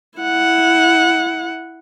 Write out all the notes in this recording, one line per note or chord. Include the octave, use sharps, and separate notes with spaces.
E4 F#5